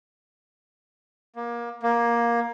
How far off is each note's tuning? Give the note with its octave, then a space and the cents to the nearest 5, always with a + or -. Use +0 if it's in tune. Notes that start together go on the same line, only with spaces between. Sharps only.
A#3 +25
A#3 +15